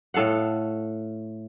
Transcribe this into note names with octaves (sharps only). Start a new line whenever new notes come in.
A2 A4 F5 F#5